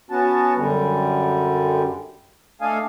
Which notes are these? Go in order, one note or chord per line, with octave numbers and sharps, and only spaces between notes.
B3 C#4 F#4 A5
F#2 D3 G3
A3 D4 A4 D#5 F5 G#5